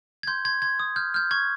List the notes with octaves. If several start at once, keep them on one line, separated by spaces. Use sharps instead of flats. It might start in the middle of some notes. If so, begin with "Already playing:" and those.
G#6
C6 G6
C6 G#6
C6 G#6
D#6
F6 G6
F6 G6
C#6 G#6